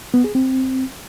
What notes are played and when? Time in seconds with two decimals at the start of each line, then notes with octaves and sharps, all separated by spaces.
0.14 B3
0.24 G#4
0.35 C4